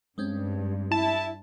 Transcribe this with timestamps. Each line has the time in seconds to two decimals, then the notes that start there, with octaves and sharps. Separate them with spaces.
0.18 G2 G#3 C4 C#4
0.92 E4 A5